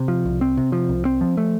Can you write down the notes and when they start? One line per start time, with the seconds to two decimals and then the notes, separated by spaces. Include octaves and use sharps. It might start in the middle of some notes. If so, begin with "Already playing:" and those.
Already playing: C3
0.08 F3
0.25 C2
0.41 C4
0.57 C3
0.72 F3
0.89 C2
1.05 C4
1.21 F3
1.37 A3